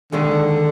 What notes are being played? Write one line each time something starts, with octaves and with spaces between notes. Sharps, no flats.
D#2 D3 D#3 G#3